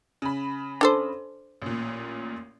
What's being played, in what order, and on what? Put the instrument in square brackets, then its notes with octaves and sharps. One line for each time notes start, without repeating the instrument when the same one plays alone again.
[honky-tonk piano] C#3 B5
[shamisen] D4 A4 C5
[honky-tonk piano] A1 A#2